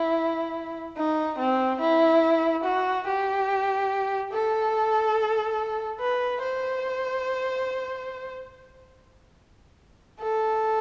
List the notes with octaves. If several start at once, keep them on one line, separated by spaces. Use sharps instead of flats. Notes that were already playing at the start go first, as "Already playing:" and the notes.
Already playing: E4
D#4
C4
E4
F#4
G4
A4
B4
C5
A4